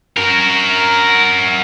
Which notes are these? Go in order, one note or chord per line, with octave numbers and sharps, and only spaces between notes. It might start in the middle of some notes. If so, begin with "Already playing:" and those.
F#4 A#4